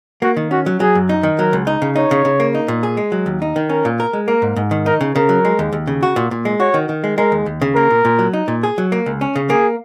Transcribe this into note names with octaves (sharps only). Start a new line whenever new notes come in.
A#3 F#4
D#3
C#4 F#4
F#3
F#3 G#4
F#2
D#4
D#3
F#3 A#4
C#2
D#4
C#3
D#4 C#5
C#3
C#3
A#3
D#4
A#2
G#4
G#3
F#3
D#2
D#4
D#3
C#4 A#4
A#2
A#4
G#3
A#3 A#4
G#2
G#2
D#3
D#4 A#4
C#3
C#3 A#4
F#3
G#3
D#2
D#2
C#3
F#4
A#2
A#2
G#3
F#4 C#5
D#3
D#3
G#3
G#3 A#4
D#2
D#2
C#3
A#3 A#4
A#2
A#2
F#3
D#4
A#2
G#4
F#3
A#3
C#2
C#4
C#3
A#3 G#4